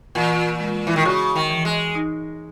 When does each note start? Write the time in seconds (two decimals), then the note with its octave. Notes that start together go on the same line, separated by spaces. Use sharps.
0.15 A#2 E3
0.60 G#3
0.87 E3
0.96 D#3
1.05 C#3 F#4
1.35 D#3
1.50 E3
1.65 G#3
1.95 D#4